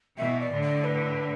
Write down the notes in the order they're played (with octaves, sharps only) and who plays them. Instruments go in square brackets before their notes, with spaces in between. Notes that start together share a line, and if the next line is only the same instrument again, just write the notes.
[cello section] B2 E3 [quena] E5
[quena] D5
[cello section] A2 D3
[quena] D5
B4